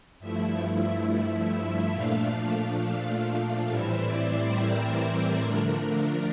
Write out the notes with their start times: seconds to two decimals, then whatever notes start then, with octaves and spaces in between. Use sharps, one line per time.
0.20 G2 F3 A3 E4 E5
1.94 A#2 F3 A3 D4 F5
3.67 A2 E3 G3 C4 E4 E5
3.97 D5
4.26 C5
4.54 A#4
5.42 D3 F3 A3 D4